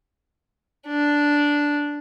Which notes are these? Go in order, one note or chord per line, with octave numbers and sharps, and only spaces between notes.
D4